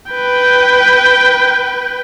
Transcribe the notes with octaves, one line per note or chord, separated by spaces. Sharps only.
B4 G5